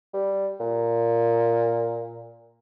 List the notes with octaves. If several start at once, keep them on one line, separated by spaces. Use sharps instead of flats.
G3
A#2